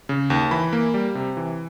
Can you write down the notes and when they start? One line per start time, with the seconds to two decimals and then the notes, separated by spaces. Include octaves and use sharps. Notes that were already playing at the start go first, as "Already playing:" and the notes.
0.09 C#3
0.30 D#2
0.51 E3 B5
0.73 A#3
0.94 G3
1.15 C3
1.37 E3